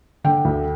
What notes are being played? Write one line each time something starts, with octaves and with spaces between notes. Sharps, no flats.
D3 G5
D2